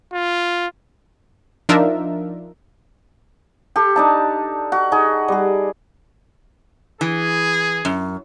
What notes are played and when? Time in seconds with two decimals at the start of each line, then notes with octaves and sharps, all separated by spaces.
0.14 F4
1.69 F3 D4 D#4 F4 A#4 E5
3.76 G4 A4
3.96 D4 D#4 A5
4.72 F#4
4.92 D#4 F#4 G#4
5.28 G3 G#4
7.01 E3 G#4
7.85 F#2